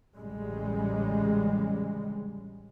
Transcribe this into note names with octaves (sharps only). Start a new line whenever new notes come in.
A1 D2 C#3 G3 G#3